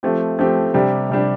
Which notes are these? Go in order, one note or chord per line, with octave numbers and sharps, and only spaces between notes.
F3 A3 C4 G4
F3 A3 C4 G4
C3 G3 D4 G4
C3 G3 D4 G4